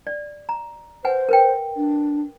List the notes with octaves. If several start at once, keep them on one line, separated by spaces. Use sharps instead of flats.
D5
A#5
B4 C5 F#5 G#5
A#4 B4 G5
D4